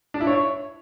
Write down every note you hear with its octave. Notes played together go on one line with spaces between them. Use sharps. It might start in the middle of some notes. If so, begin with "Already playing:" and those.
D4
E4
C#5